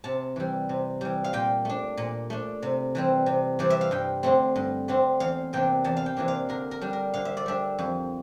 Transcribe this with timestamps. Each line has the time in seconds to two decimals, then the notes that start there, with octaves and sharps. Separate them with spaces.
0.04 C3 A5
0.36 E3 G3
0.69 C3
1.01 E3 G3
1.24 F5
1.33 A#2 G5
1.65 A3 D4
1.97 A#2
2.30 A3 D4
2.62 C3
2.95 E3 G3 C4
3.26 C3
3.59 E3 G3 C4 D5
3.70 E5
3.81 F5
3.91 G2 G5
4.23 D3 A3 C4
4.56 G2
4.88 D3 A3 C4
5.20 E2 F5
5.53 C3 E3 A#3 D4 G5
5.84 E2 A5
5.97 F5
6.06 G5
6.17 C3 E3 A#3 D4
6.28 F5
6.49 D3 A#4
6.71 A#4
6.81 G3 D4
6.93 A#4
7.14 D3 F5
7.25 E5
7.37 D5
7.46 G3 D4 E5
7.79 F2